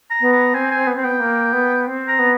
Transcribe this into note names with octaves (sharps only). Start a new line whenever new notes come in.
A#5
B3
A#5
C4 G#5
G#5
B3
C4
B3 G5
A#3
B3
C4
A#5
B3